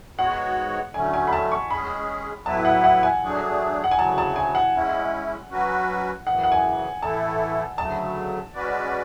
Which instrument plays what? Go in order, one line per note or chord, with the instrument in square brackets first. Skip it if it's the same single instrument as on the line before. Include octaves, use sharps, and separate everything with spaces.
[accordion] G#2 G#3 B3 F#4 C#5 [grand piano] F#5
[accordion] D3 F#3 A3 C#4 [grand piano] G#5
[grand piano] G#5
B5
A5
C#6
[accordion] G#3 C#4 G#4 [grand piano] B5
[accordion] A2 F#3 B3 E4 B4 [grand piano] A5
[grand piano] F#5
F#5
G#5
[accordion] F#3 A3 D4 G#4
[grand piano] F#5
G#5
[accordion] D2 C#3 F#3 [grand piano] A5
[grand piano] A5
G#5
F#5
[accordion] G#3 C#4 E4
F#3 C#4 F#4 B4
[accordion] F#2 C#3 E3 [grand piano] F#5
[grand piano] F#5
G#5
[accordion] A2 E3 A3 E4 A4 [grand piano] A5
[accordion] D2 C#3 F#3 A3 [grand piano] A5
[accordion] G#3 C#4 F#4 B4 D5